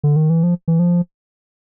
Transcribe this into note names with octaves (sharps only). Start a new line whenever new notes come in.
D3
D#3
E3
F3
E3
F3